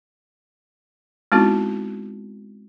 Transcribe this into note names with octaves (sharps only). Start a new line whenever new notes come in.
G#3 B3 C4 D#4 E4 F#4